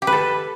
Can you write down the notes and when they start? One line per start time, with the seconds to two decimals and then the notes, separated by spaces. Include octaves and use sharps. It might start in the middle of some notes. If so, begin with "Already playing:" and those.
0.02 G4
0.07 B4
0.12 A4